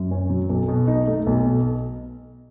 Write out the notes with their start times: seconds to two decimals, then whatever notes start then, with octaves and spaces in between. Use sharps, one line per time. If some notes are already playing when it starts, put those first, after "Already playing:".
Already playing: F#2
0.11 C#4
0.30 F#3
0.49 B1
0.68 B2
0.88 D#4
1.07 A3
1.27 B1
1.45 B2